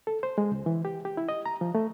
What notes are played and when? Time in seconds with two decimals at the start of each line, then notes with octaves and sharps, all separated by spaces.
0.07 A4
0.23 C5
0.38 G#3
0.52 C#2
0.66 E3
0.85 G4
1.05 G4
1.17 E4
1.29 D#5
1.46 A#5
1.61 F3
1.75 A3